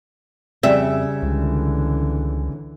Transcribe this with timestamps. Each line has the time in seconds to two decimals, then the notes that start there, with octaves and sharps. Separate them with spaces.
0.63 F2 C#3 G3 E5
1.23 C#2 D3 E3